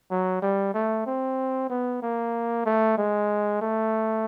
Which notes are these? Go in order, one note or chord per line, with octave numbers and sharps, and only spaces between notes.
F#3
G3
A3
C4
B3
A#3
A3
G#3
A3